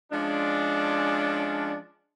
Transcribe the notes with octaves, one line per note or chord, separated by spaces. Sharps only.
F3 G#3 C#4 D4